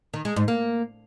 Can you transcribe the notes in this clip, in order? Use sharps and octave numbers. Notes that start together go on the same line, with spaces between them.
D#3
G#3
G#2
A#3